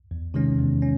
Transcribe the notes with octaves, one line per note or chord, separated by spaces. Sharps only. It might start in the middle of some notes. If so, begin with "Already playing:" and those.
E2
C3 D#3 G#3 C#4
E2
C#4